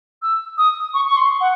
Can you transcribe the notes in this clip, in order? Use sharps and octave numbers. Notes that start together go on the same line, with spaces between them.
E6
D#6
C#6
C#6
C6
F#5